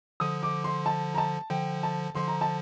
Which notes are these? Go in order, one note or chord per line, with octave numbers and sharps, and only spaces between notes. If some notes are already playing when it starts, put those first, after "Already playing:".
D3 F3 D#6
D6
C6
A5
A#5
A5
D3 F3 G5
A5
D3 F3 C6
A#5
A5